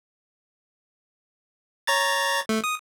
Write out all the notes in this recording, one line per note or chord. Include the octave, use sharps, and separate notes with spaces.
C#5 A#5 A6
A3
D#6